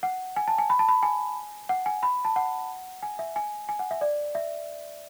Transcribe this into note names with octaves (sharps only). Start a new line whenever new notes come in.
F#5
G#5
A5
G#5
B5
A5
B5
G#5
F#5
G#5
B5
A5
F#5
G#5
E5
G#5
G#5
F#5
E5
D5
E5